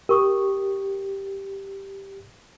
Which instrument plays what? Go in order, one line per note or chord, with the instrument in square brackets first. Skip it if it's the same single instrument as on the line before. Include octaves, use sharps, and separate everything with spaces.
[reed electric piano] G4 [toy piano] A#4 C#6 D#6